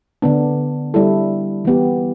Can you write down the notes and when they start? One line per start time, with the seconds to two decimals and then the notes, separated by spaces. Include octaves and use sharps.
0.22 D3 B3 D4
0.94 G3 E4 A4
1.65 E3 B3 G4